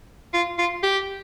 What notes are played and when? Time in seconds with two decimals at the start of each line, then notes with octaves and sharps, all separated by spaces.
0.34 F4
0.58 F4
0.83 G4